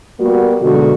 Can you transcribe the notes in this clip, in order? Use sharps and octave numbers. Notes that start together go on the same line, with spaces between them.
G3 A#3 B3 F#4
B2 D3 F#3 G#3 D#4 F#4